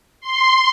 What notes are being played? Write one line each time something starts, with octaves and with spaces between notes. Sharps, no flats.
C6